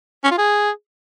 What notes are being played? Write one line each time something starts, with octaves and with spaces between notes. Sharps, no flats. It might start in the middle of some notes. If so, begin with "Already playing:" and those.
C#4
F4
G#4